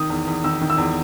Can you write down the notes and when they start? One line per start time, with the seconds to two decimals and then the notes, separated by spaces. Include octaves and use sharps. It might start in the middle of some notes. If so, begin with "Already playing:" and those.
Already playing: D#3 D#6
0.10 E2
0.27 E2
0.44 D#3 E6
0.61 D#3
0.70 E6
0.78 E2